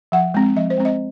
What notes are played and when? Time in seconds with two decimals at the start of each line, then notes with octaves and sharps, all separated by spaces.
0.12 F3 F#5
0.34 G#3 C4
0.56 F3 D#5
0.70 C5
0.78 G#3 C4
0.85 D#5